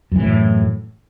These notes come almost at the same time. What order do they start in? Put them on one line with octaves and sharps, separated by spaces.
F#2 E3 A2